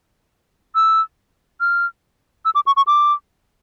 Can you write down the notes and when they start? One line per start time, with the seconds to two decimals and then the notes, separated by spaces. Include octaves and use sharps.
0.75 E6
1.61 F6
2.45 E6
2.55 D6
2.66 C#6
2.77 C#6
2.87 D6